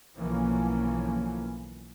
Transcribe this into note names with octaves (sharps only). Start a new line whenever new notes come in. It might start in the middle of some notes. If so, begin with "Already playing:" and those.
B1 D3 E3 F3 A#3 C#4